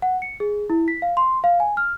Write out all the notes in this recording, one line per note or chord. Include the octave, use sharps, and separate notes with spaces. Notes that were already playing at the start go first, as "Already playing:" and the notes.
F#5
C#7
G#4
E4
B6
F5
C6
F5
G#5
F6